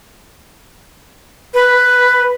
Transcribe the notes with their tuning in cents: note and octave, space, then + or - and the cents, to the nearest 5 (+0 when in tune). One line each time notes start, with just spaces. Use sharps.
B4 +5